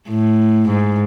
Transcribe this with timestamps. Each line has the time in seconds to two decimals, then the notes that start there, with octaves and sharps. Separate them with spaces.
0.09 A2
0.68 G#2